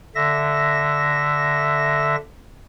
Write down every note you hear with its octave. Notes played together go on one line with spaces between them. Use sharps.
D3 E5 A#6